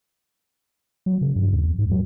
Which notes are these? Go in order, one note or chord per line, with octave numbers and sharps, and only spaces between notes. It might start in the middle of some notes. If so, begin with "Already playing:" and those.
F#3
C#3
G2
D#2
E2
G#2
F#3